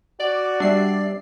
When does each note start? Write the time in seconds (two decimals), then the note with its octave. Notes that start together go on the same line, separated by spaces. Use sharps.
0.20 F#4 D5 D6
0.60 G3 D4 E5 C7